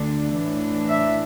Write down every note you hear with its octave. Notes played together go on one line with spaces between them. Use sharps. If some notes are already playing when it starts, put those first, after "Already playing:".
Already playing: D2 D3 A3 D4
A2 E3 D4
E5